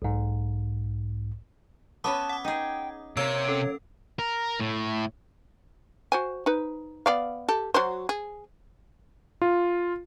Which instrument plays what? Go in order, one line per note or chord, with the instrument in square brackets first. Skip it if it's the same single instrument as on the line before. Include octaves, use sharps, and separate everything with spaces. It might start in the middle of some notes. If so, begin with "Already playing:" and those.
[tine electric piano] B1 G#2
[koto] B3 C#4 B4 [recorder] A5 [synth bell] D6 D#6
[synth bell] F#5 D6
[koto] D#4 G#4 [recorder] G5
[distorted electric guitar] C3 [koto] A#3 [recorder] C#5 [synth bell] E6 G#6 D7
[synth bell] C#4 A4
[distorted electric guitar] A#4
A2
[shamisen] F#4 C5 G#5
D#4 B4
B3 D5 F5
G4 A4
F#3 F#4 C5
G#4
[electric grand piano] F4